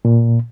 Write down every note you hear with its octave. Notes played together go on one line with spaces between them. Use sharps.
A#2